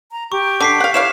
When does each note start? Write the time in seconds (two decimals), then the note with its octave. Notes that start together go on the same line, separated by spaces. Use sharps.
0.12 A#5
0.32 G4 C#6
0.60 D3 D6 B6 C7
0.80 F5 F#5
0.94 E4 C#5 F5 E7